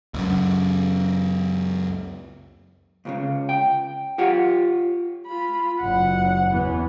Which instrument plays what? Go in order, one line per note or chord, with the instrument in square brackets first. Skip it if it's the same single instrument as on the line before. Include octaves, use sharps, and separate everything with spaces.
[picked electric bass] C#2 F#2
[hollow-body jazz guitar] C#2 A2 C#3
G5
F4 G4 C#5 F#5
[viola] F4 B5
[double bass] F#1 [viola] F#5
[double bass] E2 [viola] E3 B3